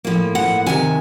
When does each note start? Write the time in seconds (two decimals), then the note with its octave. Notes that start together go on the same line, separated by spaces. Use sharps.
0.05 A2 F3 A#3
0.35 F#5
0.66 D2 C3 D#3 G#5